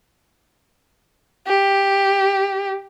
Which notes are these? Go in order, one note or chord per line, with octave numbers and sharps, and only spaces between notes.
G4